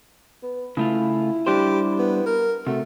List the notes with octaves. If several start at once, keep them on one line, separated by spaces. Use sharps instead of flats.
B3
C#3 A3 E4 F4
G3 D4 G4 C5
B3
A#4
C3 A3 F#4